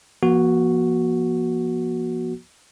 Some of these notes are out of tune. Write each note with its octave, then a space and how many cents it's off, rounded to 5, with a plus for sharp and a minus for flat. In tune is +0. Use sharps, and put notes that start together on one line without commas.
F3 -20 A#3 +45 F#4 +0